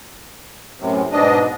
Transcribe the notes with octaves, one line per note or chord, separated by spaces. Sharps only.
F#2 A2 C3
G#2 B2 D4 D#5